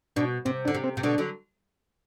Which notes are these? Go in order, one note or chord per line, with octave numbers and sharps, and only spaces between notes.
B2 D4
C3 C4
D3 D4
C3
C4
C3
B2 D3 D4
D3 F#3